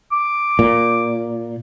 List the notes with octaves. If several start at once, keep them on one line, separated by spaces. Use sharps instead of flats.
D6
A#2